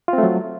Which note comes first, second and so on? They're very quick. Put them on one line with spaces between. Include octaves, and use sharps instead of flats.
F4 C4 A3 F#3